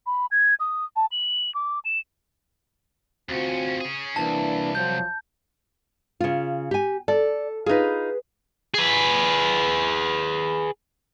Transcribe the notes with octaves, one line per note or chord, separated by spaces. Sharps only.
B5
G#6
D#6
A5
F#7
D6
E7
D2 C4 C#4 F4 F#4
C#4 G#4
C2 E3 A#3 D4 A5
F3 F#3 G6
C#3 F4
G4 G#5
A4 D5
D#4 F4 G#4 B4
G#4 B4